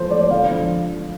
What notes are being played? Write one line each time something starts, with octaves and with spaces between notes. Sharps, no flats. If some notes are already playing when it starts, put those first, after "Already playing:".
Already playing: F3 A3 C5
A3 D5
D3 F5
F3